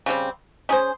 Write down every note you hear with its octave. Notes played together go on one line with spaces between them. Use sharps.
C#3 G3 C4
C#4 G#4 C5